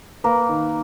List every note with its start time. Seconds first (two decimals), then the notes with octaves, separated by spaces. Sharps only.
0.24 A#3 A#4 B4
0.49 D#3